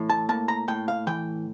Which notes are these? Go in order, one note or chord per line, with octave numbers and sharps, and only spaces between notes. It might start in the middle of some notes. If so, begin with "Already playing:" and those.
Already playing: A2 E3
A5
A#3 A5
A#5
A2 G5
F5
E3 G5